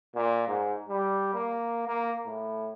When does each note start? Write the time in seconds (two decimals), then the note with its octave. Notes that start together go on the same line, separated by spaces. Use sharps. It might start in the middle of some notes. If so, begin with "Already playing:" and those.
0.15 A#2
0.47 G#2
0.89 G3
1.34 A#3
1.87 A#3
2.26 A2